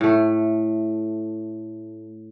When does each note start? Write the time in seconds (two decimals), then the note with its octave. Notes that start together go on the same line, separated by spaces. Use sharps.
0.01 A2 A3